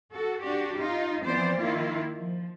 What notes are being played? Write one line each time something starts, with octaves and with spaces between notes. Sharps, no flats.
F#4 A4
D4 F#4 G4
D#4 F4
E3 F3 B3 C4 C5 D5
D#3 A#3 E4 F4
F3